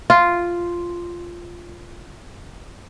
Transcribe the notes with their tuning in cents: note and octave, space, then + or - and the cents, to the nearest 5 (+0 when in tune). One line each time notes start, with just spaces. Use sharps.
F4 -5